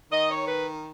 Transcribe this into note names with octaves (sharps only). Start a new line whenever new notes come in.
D#3 D#5
C#5
B4